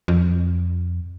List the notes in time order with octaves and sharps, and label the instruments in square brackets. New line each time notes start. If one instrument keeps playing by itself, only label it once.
[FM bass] F2